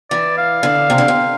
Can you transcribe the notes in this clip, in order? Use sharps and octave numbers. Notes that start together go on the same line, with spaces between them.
E3 D5
F5
D3
C3
D3
C3